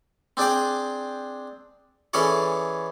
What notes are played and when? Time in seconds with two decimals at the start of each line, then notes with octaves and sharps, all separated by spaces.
0.37 C4 D4 G#4 D5 G5
2.13 E3 C#4 G#4 A4 C#5 D5